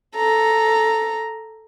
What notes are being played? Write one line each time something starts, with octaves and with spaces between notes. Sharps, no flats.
A4 A#5